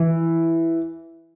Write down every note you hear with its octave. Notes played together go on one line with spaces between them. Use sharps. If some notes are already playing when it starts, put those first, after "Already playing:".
Already playing: E3